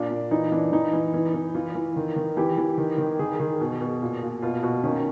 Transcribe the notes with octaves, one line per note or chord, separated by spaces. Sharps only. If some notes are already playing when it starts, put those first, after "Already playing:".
Already playing: A#2 D4
A#2
E3 D#4
E3 D4
E3 D#4
E3
E3
E3
E3 F4
E3
D#3
D#3
E3 G4
E3
D#3
D#3
D#3 G#4
D#3 G#4
B2
B2
A#2
A#2
B2 F4
B2 F#4
D#3 C#4